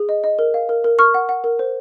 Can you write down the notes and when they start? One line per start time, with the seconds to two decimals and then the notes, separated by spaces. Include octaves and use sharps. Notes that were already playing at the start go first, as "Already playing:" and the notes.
Already playing: G#4
0.09 D#5
0.24 D#5
0.39 A#4
0.54 F5
0.69 A#4
0.84 A#4
0.99 A#4 C#6 F6
1.14 F#5
1.29 F#5
1.44 A#4
1.59 C5